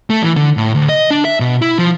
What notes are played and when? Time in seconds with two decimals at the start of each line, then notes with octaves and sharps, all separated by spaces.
0.10 A3
0.22 E3
0.36 D3
0.57 A2
0.75 D2
0.89 D#5
1.11 D4
1.25 E5
1.40 B2
1.62 E4
1.79 F3